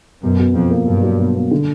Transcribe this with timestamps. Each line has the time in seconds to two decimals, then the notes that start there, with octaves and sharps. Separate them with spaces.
0.24 F#2 B2
0.39 B2
0.54 F2 B2
0.71 A#3
0.87 G2 F#3
1.03 F#3
1.19 B2
1.35 A#3
1.51 D3